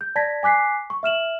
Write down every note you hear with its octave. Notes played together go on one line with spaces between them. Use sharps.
G6
D5 A5 G#6 A#6 B6
G#5 D6 F#6 B6 C7
C#6
E5 F6 E7 F#7